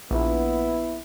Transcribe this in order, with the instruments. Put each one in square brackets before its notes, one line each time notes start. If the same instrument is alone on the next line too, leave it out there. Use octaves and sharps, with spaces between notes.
[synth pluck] A#1 [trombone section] B3 E4